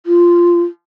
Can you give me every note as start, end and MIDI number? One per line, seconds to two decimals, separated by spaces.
0.06 0.61 65